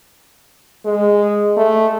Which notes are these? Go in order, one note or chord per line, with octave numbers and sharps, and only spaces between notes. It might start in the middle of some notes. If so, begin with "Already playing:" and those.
G#3
A3